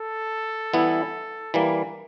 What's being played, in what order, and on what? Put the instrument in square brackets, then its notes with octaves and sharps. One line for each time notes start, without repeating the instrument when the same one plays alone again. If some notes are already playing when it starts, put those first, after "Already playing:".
Already playing: [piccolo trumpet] A4
[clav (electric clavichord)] E3 G3 B3 E4
E3 G3 A#3